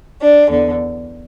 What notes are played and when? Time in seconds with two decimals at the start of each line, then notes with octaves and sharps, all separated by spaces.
0.21 D4
0.49 E2 D3